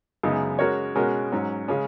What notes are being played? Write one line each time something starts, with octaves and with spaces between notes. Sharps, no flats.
F#2 C#3 G#3 B3 D#4
G#3 C#4 F#4 A#4 C#5
B2 G#3 C#4 F#4 A#4
G#2 F#3 C#4
C#3 G#3 C#4